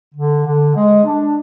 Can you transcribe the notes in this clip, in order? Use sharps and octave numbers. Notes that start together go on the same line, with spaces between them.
D3
D3
G#3
D4